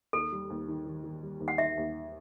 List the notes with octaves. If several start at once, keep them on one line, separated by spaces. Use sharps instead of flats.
D#2 A4
G3
D#2
D#3
D#3
D#3
G3
D#2
F#5
D#3 E5
D#2